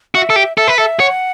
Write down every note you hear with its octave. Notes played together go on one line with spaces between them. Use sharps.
F#4 E5
A4
G4
A4 E5
B4
A4 E5
C#5 F#5